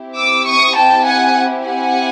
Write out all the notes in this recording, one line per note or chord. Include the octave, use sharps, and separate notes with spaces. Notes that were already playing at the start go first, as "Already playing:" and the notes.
Already playing: C4 E4 G4
D6 E6
C#6 D#6
G5 A5
F#5 G#5
F#5 G#5